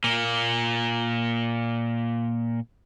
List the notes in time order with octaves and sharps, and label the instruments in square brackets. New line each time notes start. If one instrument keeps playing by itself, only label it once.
[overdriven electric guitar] A#2 A#3